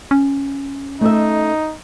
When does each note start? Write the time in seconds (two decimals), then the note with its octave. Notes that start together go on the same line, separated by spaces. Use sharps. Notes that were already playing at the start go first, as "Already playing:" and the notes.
0.11 C#4
1.01 A3 D#4 D#5 E5